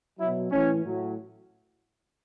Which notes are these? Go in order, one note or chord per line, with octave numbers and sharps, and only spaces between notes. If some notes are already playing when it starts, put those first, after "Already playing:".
B2 F#3 E4
A2 E3 C#4
A2 F#3